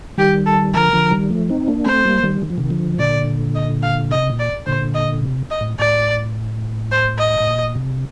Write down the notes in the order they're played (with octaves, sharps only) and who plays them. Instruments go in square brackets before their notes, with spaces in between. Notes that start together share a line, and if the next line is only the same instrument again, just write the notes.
[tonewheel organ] D#3 G3 [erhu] G4
[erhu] A4
[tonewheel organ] D3 F3 [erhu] A#4
[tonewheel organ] D3 F3
D#3 G3
F3 A3
C4 D#4
A#3 D4
[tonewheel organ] A3 C4 [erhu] C5
[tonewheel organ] G3 A#3
D#3 G3
D#3
F3
C3 D#3
D3 F3
[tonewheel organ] A#2 D3 [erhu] D5
[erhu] D#5
F5
[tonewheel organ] C3 [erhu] D#5
[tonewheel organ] A#2
[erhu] D5
[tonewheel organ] A#2 D3 [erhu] C5
[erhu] D#5
[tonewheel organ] C3
[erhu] D#5
[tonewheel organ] A2
[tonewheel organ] A2 [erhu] D5
[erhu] C5
D#5
[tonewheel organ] A2
A#2
C3